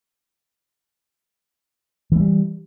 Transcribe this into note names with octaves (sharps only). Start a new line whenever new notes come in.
E3 G3 A3